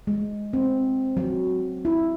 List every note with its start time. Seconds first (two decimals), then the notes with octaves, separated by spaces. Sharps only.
0.07 G#3
0.53 C4
1.17 F#3
1.85 E4